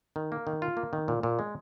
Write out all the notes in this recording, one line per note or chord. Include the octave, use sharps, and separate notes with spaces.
D#3
A#3
D#3
F4
A#3
D#3
A#2
A#2
G#3